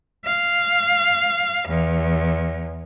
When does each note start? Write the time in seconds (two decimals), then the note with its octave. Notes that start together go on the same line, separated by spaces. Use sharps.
0.24 F5
1.67 E2